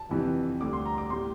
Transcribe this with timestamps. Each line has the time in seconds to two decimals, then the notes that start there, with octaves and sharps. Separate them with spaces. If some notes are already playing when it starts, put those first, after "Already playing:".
Already playing: A5
0.09 G1 F2 C3 E3 G3
0.61 D2 D3 G3 D6
0.73 C6
0.86 A#5
0.98 D6
1.10 A2 G3 C6